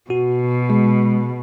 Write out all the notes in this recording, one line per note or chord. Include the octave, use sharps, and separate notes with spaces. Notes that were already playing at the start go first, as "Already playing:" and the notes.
B2 F#4
G#3